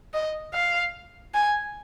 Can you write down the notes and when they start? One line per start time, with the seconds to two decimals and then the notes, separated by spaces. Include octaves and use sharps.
0.14 D#5
0.54 F5
1.34 G#5